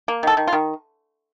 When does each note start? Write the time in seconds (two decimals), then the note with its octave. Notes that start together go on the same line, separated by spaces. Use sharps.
0.08 A#3
0.23 D#3 A4
0.37 D#3
0.47 F4
0.53 D#3